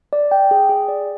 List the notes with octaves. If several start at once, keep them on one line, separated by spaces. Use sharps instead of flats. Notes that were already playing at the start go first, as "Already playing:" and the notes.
D5
G5
G#4
G#4
D5